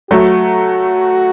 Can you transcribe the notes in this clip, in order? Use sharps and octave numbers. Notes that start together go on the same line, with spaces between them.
F#3 A3 F#4